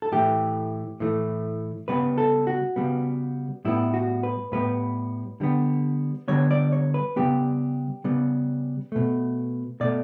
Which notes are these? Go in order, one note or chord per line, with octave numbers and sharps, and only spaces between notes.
A4
A2 E3 A3 G4
A2 E3 A3
C#3 G3 B3 B4
A4
F#4
C#3 G3 B3
A2 G3 B3 E4
F#4
B4
A2 G3 B3 B4
D3 G3 B3
D3 G3 B3 C#5
D5
C#5
B4
C#3 G3 B3 G4
C#3 G3 B3
B2 A3
B2 A3 D5